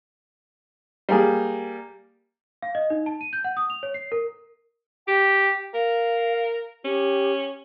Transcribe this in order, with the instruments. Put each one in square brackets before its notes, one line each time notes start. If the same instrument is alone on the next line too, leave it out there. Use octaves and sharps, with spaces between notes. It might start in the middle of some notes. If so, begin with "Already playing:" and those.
[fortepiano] G3 A#3 G#4
[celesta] F5
D#5
D#4
A5
D#7
G6
F#5
D#6
F7
C#5
C7
A#4
[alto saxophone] G4 [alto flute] G5
[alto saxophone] A#4 [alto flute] F5
[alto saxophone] C#4 [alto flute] G4